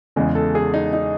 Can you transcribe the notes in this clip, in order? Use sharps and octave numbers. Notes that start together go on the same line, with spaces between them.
E2 C#3 G#3
A4
G#4
D#4
D#4